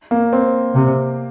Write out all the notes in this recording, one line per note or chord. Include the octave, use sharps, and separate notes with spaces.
A#3
C4
C3